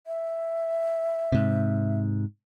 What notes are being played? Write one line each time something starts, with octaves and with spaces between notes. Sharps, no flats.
E5
G#2 C3